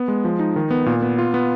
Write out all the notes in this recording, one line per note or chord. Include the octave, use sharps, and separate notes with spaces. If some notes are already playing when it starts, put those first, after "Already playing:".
Already playing: B3
G#3
F3
D#4
D#3
B3
A#2
B3
F4
B3